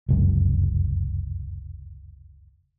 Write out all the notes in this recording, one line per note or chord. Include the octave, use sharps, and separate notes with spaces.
F1 C#2 F#2